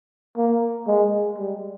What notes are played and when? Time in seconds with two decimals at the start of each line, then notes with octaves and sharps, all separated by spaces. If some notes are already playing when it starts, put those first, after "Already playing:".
0.37 A#3
0.87 G#3
1.38 G3